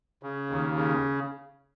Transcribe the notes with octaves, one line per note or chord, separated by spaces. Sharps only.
C#3
D#2
C#3